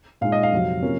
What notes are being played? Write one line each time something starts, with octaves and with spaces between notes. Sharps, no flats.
A#2 G#3 D#4 F5
D#5
F5
F2 C3 F#3
C3 F3 A#3 C#4